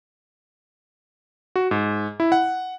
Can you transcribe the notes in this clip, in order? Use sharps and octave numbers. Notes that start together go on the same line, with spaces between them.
F#4
G#2
E4
F#5